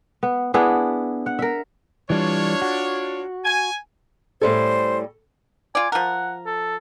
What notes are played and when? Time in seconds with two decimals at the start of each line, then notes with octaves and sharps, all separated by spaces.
0.23 B3
0.54 B3 D4 E4 G#4
1.26 F#5
1.39 A#4 E5
2.10 E3 G3 D4 F4 C#5
2.62 F#4
3.44 G#5
4.42 A2 G3 A4 C5 G#5
5.75 F4 D5 G#5
5.92 F3 A#4 F#5
6.46 A4